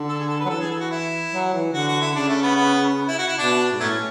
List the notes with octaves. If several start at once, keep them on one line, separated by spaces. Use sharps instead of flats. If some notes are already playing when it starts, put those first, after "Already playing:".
Already playing: D3
A4
G#4
A4
B4
F#3
E3 A4
G#4
A4
F#4
E4
F#3
E3
D3 F#4
F#4
E4
C#3 D4
A3
B3
B3
E4
F#4
E4
B2 D4
G#2
A2 F#3 A3 C#4